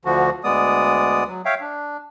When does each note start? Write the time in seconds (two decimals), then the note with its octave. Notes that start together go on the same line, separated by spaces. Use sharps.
0.05 D2 D3 F3 F#4
0.44 D2 G#3 B3 D5 D#6
1.28 F#3
1.45 C#5 E5 F5 G5
1.61 D4